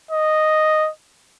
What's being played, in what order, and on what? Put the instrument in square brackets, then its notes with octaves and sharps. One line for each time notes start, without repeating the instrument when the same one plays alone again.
[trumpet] D#5